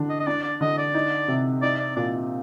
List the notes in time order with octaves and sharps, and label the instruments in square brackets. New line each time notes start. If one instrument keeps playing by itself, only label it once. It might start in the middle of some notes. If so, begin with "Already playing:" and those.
Already playing: [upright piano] D3 D4
[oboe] D#5
D#5
[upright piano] D4 [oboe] D5
[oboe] D5
[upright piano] D3 [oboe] D#5
[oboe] D5
[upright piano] D#4
C3
[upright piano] D#4 [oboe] D5
[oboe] D5
[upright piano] A#2 [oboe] D5